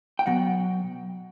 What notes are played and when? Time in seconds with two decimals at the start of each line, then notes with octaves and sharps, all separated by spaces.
0.19 G5
0.26 B2 F#3 B3 F#5